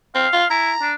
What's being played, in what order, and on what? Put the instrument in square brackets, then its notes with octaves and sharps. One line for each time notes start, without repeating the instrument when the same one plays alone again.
[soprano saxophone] C4 [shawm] F5
[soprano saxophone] F4
[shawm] E4 [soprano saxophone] A#5
[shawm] D4